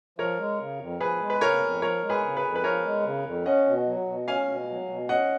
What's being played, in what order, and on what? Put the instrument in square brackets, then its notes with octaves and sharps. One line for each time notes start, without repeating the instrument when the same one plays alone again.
[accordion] F3 [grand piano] A#4 C#5
[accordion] G#3
C#3
F2
[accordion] F3 [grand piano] G#4 B4
[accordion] G#3
[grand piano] B4
[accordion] C#3 [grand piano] A#4 C#5
[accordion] F2
[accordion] F3 [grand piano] A#4 C#5
[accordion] G#3
[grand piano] G#4 B4
[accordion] C#3
[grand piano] G#4 B4
[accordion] F2
[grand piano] B4
[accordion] F3 [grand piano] A#4 C#5
[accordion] G#3
C#3
F2
[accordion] C#4 [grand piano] D#5 F#5
[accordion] B2
F#3
B2
[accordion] C#4 [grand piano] F5 G#5
[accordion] B2
F#3
B2
[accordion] C#4 [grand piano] D#5 F#5